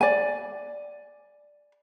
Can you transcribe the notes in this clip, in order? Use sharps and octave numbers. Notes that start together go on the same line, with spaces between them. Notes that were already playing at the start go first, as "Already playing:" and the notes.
D5 G#5